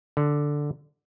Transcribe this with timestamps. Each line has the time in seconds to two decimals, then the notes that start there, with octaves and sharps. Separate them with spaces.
0.17 D3